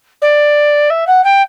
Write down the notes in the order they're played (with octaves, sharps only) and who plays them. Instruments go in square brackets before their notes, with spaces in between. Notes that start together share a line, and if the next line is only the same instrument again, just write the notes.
[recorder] D5
E5
F#5
G5